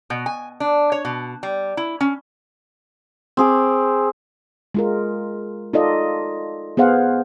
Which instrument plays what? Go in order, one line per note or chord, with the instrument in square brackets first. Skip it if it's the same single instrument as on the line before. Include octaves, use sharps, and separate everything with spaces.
[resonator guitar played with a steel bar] B2
G#5
D4
C#5
B2
G3
E4
C#4
[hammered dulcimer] C4 G#4 D6
[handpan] G#3 F4 A#4
D#4 F4 A4 D5 D#5
B3 G#4 C5 F5 F#5